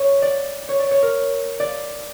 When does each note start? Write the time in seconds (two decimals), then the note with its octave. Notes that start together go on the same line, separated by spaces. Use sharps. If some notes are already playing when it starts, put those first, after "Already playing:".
Already playing: C#5
0.22 D5
0.69 C#5
0.80 D5
0.91 C#5
1.03 A#4
1.60 D5